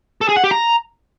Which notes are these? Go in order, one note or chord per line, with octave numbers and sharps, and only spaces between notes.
A4
G#4
F#5
G4
A#5